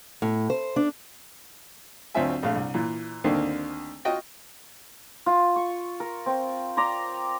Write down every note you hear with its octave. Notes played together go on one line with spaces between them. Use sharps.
A2
C5
D4
D2 F#3 C4 F4 E5 G#5
A#1 A3 F5
C2
A#2 E3
D2 D3 D#3 A#3 C4
F4 F#4 D#5 G5
F4
C#6
A#4
C4
D5 A#5 C6